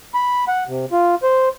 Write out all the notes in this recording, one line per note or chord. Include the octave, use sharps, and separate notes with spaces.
B5
F#5
C3
F4
C5